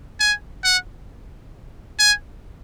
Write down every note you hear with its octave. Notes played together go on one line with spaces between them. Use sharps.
G#5
F#5
G#5